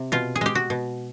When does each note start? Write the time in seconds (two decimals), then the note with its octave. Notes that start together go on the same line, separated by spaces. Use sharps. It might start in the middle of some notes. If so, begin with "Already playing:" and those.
Already playing: C3
0.12 B2 F4
0.36 G#4
0.41 G#3 G4
0.55 F#4
0.70 B2